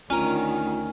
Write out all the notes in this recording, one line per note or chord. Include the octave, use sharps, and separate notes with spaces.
D2 D#3 C#4 F4 A#4 G#5